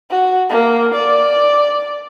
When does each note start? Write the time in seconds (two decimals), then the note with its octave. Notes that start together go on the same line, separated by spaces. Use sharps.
0.11 F#4
0.50 A#3
0.94 D5